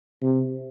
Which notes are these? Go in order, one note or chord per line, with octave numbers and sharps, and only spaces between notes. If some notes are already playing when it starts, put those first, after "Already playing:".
C3